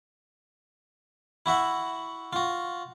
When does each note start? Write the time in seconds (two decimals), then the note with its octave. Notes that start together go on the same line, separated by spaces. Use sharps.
1.46 E4 F#4 E5 F#5
2.33 F4 F#4